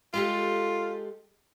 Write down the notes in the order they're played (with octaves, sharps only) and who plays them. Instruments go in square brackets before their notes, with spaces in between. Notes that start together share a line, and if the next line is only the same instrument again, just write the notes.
[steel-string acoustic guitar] G#3 G4 A4 [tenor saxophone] F4